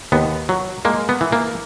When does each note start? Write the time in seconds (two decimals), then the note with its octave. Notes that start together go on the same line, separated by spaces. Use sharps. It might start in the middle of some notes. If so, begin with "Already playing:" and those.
0.12 D#2 B3
0.49 F#3
0.85 G#3 A#3
1.09 B3
1.21 E3
1.32 A#3